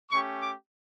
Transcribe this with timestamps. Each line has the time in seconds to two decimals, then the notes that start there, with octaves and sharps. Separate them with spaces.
0.11 A3 C#4 G4 C#6
0.41 D6